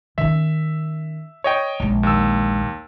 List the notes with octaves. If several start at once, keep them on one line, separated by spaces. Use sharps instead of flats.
D#3 C#4 E5
C#5 D#5 G5
A#1 G#3
D#2 E6